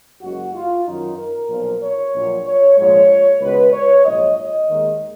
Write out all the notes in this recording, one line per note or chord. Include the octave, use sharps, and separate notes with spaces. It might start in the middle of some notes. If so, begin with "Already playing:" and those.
F#1 F#2 C#3 G#3 F#4
F4
F#2 D#3 F#3 D#4
A#4
B1 A#2 F3
C#5
A#1 A#2 F#3
C#5
A#1 G#2 F3 G#3 C#5
C#2 B2 G#3 B4
C#5
A#1 G#2 F#3 D#5
D#5
D#2 D#3 G#3